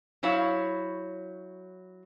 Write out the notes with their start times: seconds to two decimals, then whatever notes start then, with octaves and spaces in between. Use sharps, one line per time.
0.23 F#3 E4 C5 C#5 F5